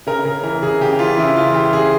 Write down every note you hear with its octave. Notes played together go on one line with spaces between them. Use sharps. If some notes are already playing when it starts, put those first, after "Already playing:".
C#3 A#4
C#3 A#4
E3 A#4
C#3 G#4
C#3 G4
E3 F4
C#3 E4
E3 F4
E3 G4
C#3 G#4